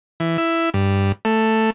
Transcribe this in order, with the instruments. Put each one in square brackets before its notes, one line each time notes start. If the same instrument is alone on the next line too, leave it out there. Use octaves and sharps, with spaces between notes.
[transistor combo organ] E3
E4
G2
A3